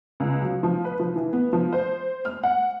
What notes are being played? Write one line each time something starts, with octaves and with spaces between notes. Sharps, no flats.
C#2
F#3
F3
B4
F3
E3
B3
F3
C5
F6
F#5